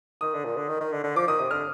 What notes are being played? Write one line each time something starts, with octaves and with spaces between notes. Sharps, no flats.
D#3 D#6
D3
A#2
D3
D#3
D#3
D3
D3
F3 D6
D#3 D#6
C3 D#6
D3 F6